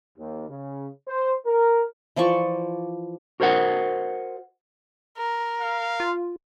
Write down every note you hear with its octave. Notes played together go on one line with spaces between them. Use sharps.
D#2
C#3
C5
A#4
E3 F3 D5 C#6
F#4 A#4 C5 D#5 F#5
A#4
F5
F4